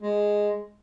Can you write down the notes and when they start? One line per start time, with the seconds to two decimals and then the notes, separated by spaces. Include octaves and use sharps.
0.02 G#3